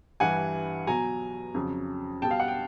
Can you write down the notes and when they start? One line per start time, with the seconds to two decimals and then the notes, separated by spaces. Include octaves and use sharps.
0.20 G2 E3 G3 F#5 G#5
0.87 B2 F#3 G#5 A#5
1.54 F2 C#3 F#3
2.22 B2 G3 G5 A5
2.31 F5
2.40 F#5
2.48 G5